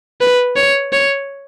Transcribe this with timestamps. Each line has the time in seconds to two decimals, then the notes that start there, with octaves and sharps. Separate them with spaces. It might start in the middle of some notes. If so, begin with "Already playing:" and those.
0.21 B4
0.56 C#5
0.93 C#5